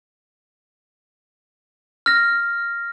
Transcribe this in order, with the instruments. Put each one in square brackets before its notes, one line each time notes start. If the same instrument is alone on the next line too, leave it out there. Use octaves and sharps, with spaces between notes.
[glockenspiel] F6 A#6